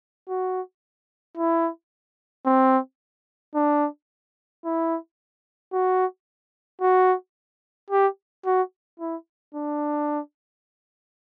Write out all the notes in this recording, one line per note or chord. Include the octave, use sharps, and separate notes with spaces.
F#4
E4
C4
D4
E4
F#4
F#4
G4
F#4
E4
D4